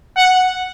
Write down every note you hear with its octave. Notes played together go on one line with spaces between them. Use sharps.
F#5